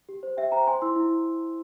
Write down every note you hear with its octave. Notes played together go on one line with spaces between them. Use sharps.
G4
C5
G4 E5 G5
C5 G5 A#5
C5 G#5 C6
E4 C6 E6
E4